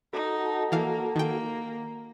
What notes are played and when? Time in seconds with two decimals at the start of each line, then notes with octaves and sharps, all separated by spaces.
0.13 D#4 F#4 A4
0.72 E3 A#3 F5
1.16 D#3 A#3 G5